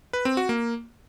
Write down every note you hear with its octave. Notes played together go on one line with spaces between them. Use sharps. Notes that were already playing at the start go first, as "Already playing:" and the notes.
B4
C4
F#4
A#3